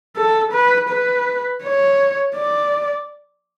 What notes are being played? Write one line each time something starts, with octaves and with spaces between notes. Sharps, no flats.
A4
B4
B4
C#5
D5